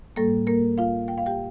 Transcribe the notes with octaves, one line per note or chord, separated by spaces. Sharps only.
A2 G3 A#3 A4
A#3 A#4
F4 F5
G5
F5
G4 G5